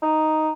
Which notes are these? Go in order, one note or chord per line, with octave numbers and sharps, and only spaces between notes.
D#4